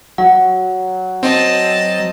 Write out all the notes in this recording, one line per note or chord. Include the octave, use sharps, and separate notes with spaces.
F#3 F#5
C4 D#5 A5